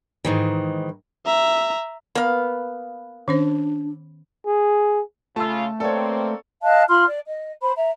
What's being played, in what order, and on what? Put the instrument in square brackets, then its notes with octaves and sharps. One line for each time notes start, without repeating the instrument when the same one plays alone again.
[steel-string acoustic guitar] G#2 D#3 E3
[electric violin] E5 A#5
[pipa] A#3 F5 [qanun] B3
[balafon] D#3 C#4 C5 [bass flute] D4
[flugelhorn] G#4
[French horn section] C#3 F4 [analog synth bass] A3 [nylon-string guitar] A4 [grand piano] A5 E6
[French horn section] A#3 C4 [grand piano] A4 C#5 [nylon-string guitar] B4 D5
[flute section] D#5 F5 A5 F#6
F4 B5 C6 F6
D5
D#5
C5 B5
E5 A#5